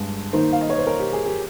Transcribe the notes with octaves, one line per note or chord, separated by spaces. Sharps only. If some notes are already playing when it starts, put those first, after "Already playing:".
Already playing: G2 G#3
D#3 A#3 D#4 C5
F5
D#5
C#5
C5
A#4
G4
G#4
G4